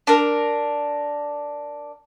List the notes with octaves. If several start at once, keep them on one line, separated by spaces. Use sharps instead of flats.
D4 A#4